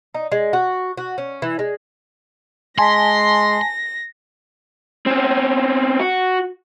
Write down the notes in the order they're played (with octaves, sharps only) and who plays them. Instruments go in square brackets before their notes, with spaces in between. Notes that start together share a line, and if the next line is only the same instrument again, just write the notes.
[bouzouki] D#4
G#3
F#4
F#4
C#4
E3
G#3
[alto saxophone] G#3 [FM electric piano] G#5 A5 B6 [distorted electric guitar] C6 [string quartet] A#6
[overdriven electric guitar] C4 C#4
F#4